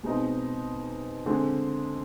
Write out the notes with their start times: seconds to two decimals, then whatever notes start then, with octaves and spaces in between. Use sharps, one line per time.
0.03 B2 G#3 C4 D#4
1.26 D3 G#3 C4